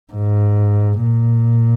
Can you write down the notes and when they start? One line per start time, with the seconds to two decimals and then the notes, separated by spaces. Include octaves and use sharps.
0.13 G#2
1.03 A#2